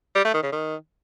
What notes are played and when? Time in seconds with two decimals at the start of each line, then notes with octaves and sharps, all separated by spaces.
0.15 G3
0.25 A3
0.34 D#3
0.43 C#3
0.52 D#3